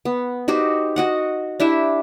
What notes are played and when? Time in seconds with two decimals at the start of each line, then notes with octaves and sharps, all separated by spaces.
0.05 B3
0.48 D#4 F#4 G4 C5
0.96 F#4 D#5 F#5
1.60 D4 E4 G4 E5